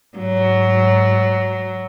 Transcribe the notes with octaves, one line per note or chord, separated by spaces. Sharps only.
G#2 F#3